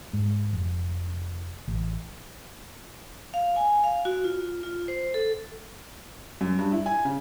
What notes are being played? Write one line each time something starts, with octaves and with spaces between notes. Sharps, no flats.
G#2
F1
A1
F5
G#5
F5
F#4
F4
F4
C5
A4
F#2
G2
E4
G#5
C#3